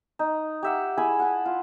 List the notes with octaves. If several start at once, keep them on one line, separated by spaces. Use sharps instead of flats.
D#4
G4 E5 F#5
E4 G#4 G#5 B5
F#5 A5
F4